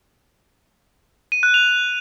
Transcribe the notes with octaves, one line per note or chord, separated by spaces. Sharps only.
D#7
F#6
F7